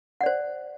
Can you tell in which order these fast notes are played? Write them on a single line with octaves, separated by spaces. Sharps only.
F#5 D5 C5